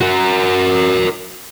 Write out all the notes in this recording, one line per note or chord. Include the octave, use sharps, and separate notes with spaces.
F#4 A#4